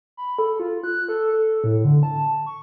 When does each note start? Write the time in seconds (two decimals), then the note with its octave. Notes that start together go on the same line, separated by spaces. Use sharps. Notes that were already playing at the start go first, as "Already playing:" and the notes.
0.17 B5
0.39 A4
0.60 F4
0.84 F#6
1.09 A4
1.32 A4
1.64 A2
1.84 D3
2.03 A5
2.46 C#6